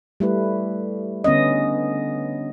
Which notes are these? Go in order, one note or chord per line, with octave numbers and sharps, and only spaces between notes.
G3 A3 E4 B4
D3 B3 C#4 D#5